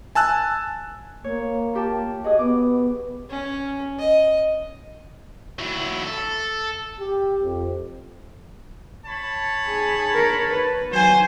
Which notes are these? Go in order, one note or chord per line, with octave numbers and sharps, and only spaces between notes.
G#5 A5 E6 F#6
A#3 C#5
F4 G4 A5
F#4 G#4 D#5 D#6
B3 D6
C#4
D#5
F#3 E4
A4
G4
F2
C#5 A5 B5
G#4
A#4
B4
F#3 C5 G#5